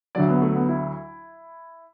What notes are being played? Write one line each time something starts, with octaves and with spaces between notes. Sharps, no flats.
D2 D3 F#3 D5
B3
A3
B3
E4